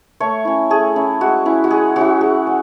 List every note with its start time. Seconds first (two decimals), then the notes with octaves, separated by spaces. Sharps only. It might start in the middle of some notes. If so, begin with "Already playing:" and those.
0.20 A3 C#5
0.45 C#4 E4
0.70 A3 G#4
0.96 C#4 E4
1.21 G#3 F#4
1.46 C#4 E4
1.64 F#4
1.71 G#3 G#4
1.96 C#4 E4 F#4
2.21 F#3 G#4
2.47 C#4